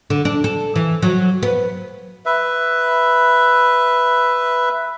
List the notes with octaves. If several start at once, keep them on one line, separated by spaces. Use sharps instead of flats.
D3
D4
A4
E3
F#3
B3
B4 E5